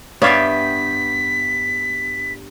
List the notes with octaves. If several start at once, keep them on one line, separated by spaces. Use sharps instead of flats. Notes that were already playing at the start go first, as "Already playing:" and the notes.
G2 B3 C#5 D5 E5 F5 G5 B6